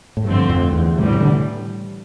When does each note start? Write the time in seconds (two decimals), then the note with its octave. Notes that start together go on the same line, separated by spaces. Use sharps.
0.17 A2
0.24 G2 D3 F3 A3 C4
0.49 F2
0.73 E2
0.98 A2 C3 E3 G3
1.05 D3
1.13 C3
1.20 D3